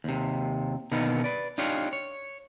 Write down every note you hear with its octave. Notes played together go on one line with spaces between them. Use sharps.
D#2 C3
B2 D3 D#3 A#3 B3 D#4
B4 D5
D4 D#4 F4 G4 C#5
C#5